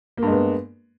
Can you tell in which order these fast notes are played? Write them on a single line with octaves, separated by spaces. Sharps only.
A#3 G2 G#3 B3